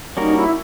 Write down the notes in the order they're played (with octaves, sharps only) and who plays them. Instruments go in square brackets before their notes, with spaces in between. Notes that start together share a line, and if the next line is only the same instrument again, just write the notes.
[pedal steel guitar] G3 A#3 C#4 F#4 A#4 [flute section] D#4
[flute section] E4